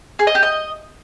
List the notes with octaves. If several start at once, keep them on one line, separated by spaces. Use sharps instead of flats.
G#4
D#5
G4
D#5